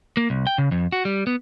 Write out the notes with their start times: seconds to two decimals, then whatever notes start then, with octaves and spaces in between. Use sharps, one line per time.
0.17 A#3
0.30 C2
0.47 G5
0.58 C#3
0.72 F2
0.92 F#4
1.05 G3
1.27 B3